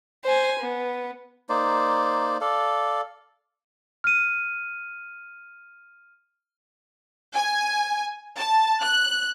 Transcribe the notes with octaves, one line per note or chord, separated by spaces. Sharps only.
C5 G#5
B3
A#3 D#4 C5 D5
A4 D5 F5
F6 D#7
G#5
A5
F#6